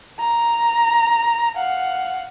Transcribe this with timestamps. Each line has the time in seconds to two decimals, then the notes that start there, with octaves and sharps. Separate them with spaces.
0.19 A#5
1.56 F5 F#5